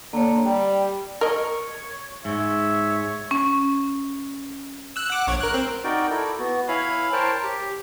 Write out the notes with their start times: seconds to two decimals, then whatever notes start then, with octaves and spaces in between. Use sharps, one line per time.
0.13 D3 A#3 C#5
0.45 G3 G5
1.21 A#4 C#5 D#5
2.25 G#2 C#5 E5
3.31 C#4
4.96 E6 F#6
5.10 F#5 D6
5.27 A#1 C#5
5.40 A#4 F#6
5.54 C4
5.84 D#4 F#4 A#4 D5 G5
6.10 E4 A4 D5
6.39 B3 F#4
6.68 E4 C#5 F5 G#5 B5
7.13 A#4 C5 C#5 G5 A5
7.44 G4